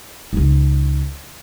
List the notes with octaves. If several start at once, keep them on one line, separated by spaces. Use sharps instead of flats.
C#2 D#4